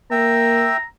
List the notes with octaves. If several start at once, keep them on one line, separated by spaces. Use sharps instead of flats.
A#3 E5 G5 A#5 E6